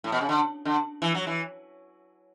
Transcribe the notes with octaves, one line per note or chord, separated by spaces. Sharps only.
A2
B2
C#3
D3
D3
E3
F#3
E3